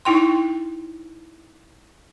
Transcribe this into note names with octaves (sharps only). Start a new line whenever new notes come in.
D#4 E4 G5 C6